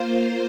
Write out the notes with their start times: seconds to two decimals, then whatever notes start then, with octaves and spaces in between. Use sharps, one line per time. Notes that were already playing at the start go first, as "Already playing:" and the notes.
Already playing: A#3 F4 C5